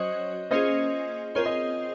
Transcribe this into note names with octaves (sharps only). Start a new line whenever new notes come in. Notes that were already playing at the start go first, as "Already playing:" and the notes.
Already playing: F#3 C#4 F#4 C5 C#5 D#5
A#3 C#4 F4 G#4 C5 D#5
C4 F4 G#4 A#4 C5 C#5
D#5